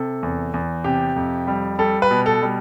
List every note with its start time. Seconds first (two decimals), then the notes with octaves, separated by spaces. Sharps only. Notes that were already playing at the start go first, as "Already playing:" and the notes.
Already playing: C3 A4
0.23 E2
0.54 E2
0.84 C3 G4
1.16 F2
1.47 G3
1.79 G3 A4
2.02 B4
2.11 B2
2.26 A4
2.42 G3